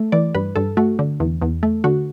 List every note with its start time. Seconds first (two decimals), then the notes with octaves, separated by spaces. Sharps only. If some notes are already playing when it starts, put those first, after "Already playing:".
Already playing: A3
0.12 E3 D5
0.35 G2 B4
0.56 G2 A4
0.77 A3 F#4
0.99 D3
1.20 E2
1.42 E2
1.63 A3
1.84 D3 F#4